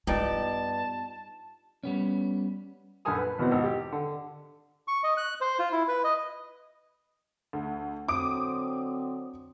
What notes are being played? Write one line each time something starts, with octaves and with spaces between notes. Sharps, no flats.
G2 B3 D#4 F4 D5 A5
G3 B3 C#4
A#1 F#2 A4 A#4 G#5 D#6
B4
E2 B2 B3 C4
G#1
G4
D3
C#6
D#5
F#6
C5
F4
E4
B4
D#5
D2
D3 F#3 C4 D6 D#6 D7